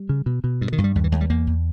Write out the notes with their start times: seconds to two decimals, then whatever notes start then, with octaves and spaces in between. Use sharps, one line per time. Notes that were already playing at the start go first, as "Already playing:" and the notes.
Already playing: G3
0.09 C#3
0.26 B2
0.44 B2
0.61 G2
0.73 D#3
0.78 G2
0.84 G3
0.95 D#2 G3
1.04 E3
1.12 D#2 G#3
1.21 G3
1.30 E2 A#3
1.47 E2